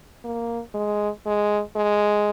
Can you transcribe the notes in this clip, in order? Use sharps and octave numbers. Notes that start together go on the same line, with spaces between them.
A#3
G#3
G#3
G#3